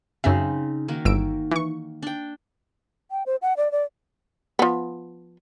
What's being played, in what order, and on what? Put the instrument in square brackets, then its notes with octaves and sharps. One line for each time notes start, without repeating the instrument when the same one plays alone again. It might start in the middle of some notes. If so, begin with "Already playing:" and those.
[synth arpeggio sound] F#2 E5 [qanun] C#3 C4 D#4
[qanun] D#3 A#3 F#4
[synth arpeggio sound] G1 E6 D7
E3 C#6
[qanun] D4 G5
[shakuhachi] G5
C5
F#5
D5
D5
[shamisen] F3 B3